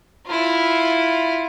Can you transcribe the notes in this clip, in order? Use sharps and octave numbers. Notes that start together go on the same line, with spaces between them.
E4 F4